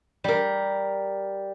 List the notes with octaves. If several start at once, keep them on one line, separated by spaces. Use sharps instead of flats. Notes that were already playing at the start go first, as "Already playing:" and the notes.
G3 A#4